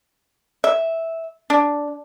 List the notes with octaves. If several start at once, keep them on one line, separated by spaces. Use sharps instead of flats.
E5
D4